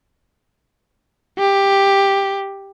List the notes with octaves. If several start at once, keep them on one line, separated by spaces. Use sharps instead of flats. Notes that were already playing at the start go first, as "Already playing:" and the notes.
G4